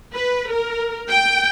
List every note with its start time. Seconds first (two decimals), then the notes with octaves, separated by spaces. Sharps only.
0.13 B4
0.52 A#4
1.09 G5